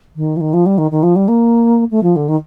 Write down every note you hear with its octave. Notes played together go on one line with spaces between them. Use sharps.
D#3
F3
D#3
F3
G3
D#3
D#3
F3
G3
A#3
A3
F3
D3
D#3